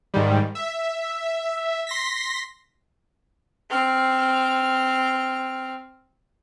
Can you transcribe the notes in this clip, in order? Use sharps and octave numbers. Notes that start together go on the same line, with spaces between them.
G#2 D#3 G3
E5
C6 A#6 B6
C4 F6